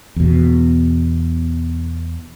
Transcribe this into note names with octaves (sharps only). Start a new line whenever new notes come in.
E2 B2